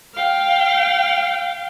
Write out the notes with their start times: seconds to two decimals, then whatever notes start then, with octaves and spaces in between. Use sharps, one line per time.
0.15 F5 G5